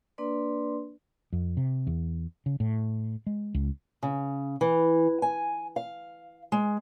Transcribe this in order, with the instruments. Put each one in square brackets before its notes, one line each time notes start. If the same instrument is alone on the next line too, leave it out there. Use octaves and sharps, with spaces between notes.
[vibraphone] A#3 D4 B4 D5 C6
[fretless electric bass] F2
C3
E2
C#3
A2
G#3
C#2
[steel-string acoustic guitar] C#3
E3
G#5
F5
G#3